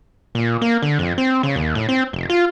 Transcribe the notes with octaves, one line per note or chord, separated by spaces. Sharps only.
A#2
A#3
D3
F2
C4
C#3
D#2
A2
C4
F1
F4